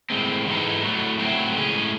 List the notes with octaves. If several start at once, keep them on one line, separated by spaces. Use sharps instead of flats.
A2 G#3 C4
G#2 E3 G#3 D#4 A4
A2 F#3 A3
A2 F#3 A3 C4 E4
A2 G#3 C#4 G#4